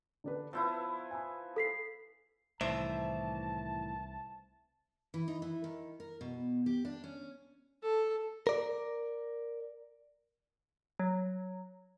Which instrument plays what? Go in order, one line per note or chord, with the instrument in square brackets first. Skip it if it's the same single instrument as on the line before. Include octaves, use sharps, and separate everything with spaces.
[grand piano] D3 D4 B4
[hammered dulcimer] F3 B3 E4 [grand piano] A5 E6 G6
[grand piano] G#5 B5
[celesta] A4 B6 C7
[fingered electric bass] C2 [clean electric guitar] A2 D#3 E3 [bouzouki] C5 E5 [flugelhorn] A5
[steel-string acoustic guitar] E3
D#4
E3
D#3
A#4
B2
G4
D4
C#4
[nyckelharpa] A4
[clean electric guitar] A#4 D5
[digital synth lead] F#3